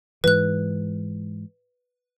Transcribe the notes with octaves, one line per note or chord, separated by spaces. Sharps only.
G#2 E3 B4 F#6